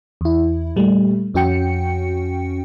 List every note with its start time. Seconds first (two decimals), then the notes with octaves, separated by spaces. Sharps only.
0.21 E2 E4
0.76 A#2 G3 A3
1.34 F2 C#4 F#4 G5 C#7